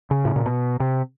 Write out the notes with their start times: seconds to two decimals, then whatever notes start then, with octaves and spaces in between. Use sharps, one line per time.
0.11 C#3
0.25 A2
0.36 A#2
0.46 B2
0.80 C3